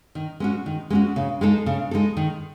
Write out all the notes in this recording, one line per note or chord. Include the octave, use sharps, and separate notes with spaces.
D#3
G#3 C#4 F#4
D#3
G#3 C#4 F#4
C#3
G#3 D#4 A4
C#3
G#3 D#4 A4
D#3